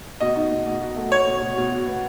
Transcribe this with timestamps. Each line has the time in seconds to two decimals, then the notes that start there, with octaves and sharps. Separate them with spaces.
0.20 B2 D#5
0.36 D#4
0.51 B2
0.67 B2
0.81 F#4
0.96 A3
1.11 F#4 C#5
1.27 B2
1.41 B2
1.57 B2
1.72 F#4
1.87 B3